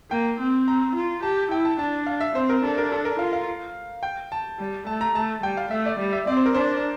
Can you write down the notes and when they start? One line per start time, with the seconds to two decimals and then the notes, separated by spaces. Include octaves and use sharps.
0.11 A#3 G5
0.39 C4
0.68 A#5
0.95 F4
1.22 G4 A5
1.51 E4 G5
1.65 A5
1.79 D4 A5
2.07 F5
2.21 E5
2.35 C4 C5
2.49 A#4
2.63 D4 A4
2.78 A#4
2.92 A4
3.05 A#4
3.19 F4 F5
3.33 F5
4.03 G5
4.32 A5
4.59 G3
4.87 A3 A5
5.01 A#5
5.15 A3 A5
5.43 G3 G5
5.57 F5
5.71 A3 E5
5.86 D5
5.99 G3
6.13 E5
6.27 C4 D5
6.37 C5
6.46 A#4
6.54 D4 C5